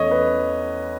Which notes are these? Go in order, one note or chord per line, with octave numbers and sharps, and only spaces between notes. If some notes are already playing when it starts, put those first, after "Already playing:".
Already playing: E2 A3 C#4 C#5 D#5
B4